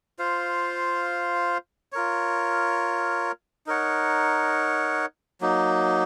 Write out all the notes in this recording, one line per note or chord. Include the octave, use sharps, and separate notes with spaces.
F4 C5 F5
F4 A#4 C#5
D#4 A#4 C#5 F#5
F#3 A#3 D#4